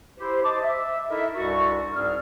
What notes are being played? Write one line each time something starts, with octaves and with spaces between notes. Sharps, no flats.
E4 G4 C5
D#5 A5 D6
E5
D#4 E4 A4 A#4 D#5 E5
C2 G2 F#4 A4 C#6
C2 G#2 C4 G#4 D5 F6